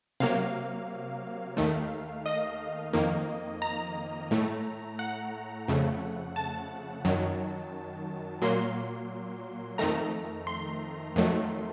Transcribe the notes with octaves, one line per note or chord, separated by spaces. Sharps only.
C3 F#3 A#3 F5
D#2 D#3 A3
D#5
F2 D#3 A#3
A#5
A2 A3
F#5
F2 C#3 A3
A5
F#2 D#3 F#3
A#2 F#3 A#3 C6
F2 D#3 A3 A#5
C6
F2 D#3 F#3 A3